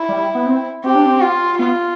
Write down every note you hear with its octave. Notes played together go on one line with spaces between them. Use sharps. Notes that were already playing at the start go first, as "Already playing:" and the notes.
Already playing: E4
G3
B3
C4
C4 G4
D4
C4
F4
B3 F4